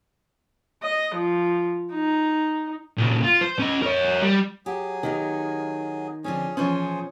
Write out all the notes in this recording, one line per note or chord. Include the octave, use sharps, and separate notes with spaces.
D#5
F3
D#4
A#2 C#3
F4
C5
C#4 D#5
A#4 C#5
G3
F#3 G4 G#4
D#3 B3 D#4 G4
D3 F3 C4 C#4 G#4
B2 E3 F3 C#4 G#4 C5 C#5